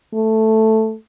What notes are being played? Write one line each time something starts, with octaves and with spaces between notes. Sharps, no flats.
A3